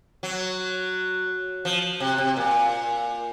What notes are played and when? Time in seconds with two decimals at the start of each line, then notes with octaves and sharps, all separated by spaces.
0.23 F#3
1.65 F3
2.00 C3
2.18 C3
2.37 A#2